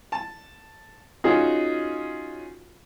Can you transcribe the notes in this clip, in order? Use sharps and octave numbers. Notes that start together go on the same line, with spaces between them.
A5
C#4 D#4 F4 F#4 G#4